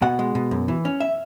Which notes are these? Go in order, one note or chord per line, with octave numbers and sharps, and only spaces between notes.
B2 F#5
G#3
B2
F#2
E3
C#4
E5